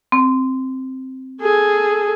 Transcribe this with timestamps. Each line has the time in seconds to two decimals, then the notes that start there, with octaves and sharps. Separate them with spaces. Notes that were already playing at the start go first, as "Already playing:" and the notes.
0.12 C4
1.41 G#4 A4